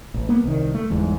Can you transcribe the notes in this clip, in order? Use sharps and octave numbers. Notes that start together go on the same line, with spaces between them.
A1
A#3 B3
C2 D#3
A3
G1 E2 G#2